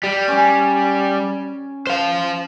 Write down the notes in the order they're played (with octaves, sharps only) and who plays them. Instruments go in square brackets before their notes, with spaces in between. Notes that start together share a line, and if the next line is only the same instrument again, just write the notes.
[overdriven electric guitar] G3
[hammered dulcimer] C#4
[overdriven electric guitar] C5 F5